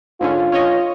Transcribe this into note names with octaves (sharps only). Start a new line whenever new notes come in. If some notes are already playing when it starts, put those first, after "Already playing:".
G#2 D3 C#4 F4
C#4 C#5 D#5